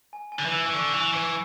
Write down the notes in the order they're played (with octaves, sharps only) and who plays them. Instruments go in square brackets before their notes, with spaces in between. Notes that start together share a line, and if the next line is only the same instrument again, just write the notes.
[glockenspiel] G#5
G#5
[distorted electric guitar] D3
E3
[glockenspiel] E6
[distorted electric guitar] E3
[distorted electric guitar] D3 [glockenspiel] C#6
[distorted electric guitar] E3 [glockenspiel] G#5
[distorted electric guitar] E3 [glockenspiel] G#5